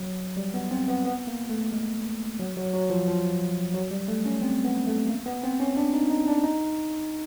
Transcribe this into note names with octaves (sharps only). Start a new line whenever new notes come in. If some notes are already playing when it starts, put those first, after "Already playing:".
Already playing: F#3
G3
B3
C4
B3
B3
A#3
A3
G#3
F#3
F#3
F#3
F3
F3
F#3
G3
A3
C#4
C4
B3
A3
A#3
B3
C4
C#4
D4
D#4
D#4
D4
D#4